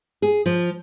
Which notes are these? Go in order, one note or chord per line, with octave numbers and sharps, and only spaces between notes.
G#4
F3